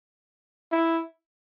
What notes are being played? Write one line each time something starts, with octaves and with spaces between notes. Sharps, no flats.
E4